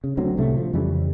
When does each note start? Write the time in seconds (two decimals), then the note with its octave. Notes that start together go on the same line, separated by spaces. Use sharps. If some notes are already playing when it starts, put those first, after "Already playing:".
0.04 C#3
0.17 D2 D3 F#3 C4
0.37 C2 A2 C3 A3
0.57 F3
0.73 F2 C#3 E3 G3